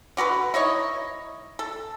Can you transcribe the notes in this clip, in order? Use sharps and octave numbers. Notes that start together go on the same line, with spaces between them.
D3 F#4 A4 B4
D#4 E4 C#5 D#5
A4